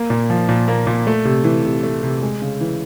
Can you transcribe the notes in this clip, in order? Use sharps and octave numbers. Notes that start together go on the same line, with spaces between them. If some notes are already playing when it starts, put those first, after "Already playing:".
Already playing: A#3
A#2
F3
A#2
A#3
A#2
A3
C3
E3
C3
A3
C3
G#3
C#3
E3